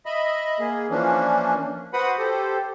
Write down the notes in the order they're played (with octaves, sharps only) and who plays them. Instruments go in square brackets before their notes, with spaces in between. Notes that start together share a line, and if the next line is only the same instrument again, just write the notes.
[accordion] D#5 E5 B5
A#3 G#4
E3 F3 A#3 C#4 D4
F#4 B4 C5 F#5 B5 D#6
G4 A4 C5